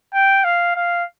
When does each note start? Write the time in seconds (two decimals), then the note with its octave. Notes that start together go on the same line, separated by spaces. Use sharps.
0.14 G5
0.44 F5
0.76 F5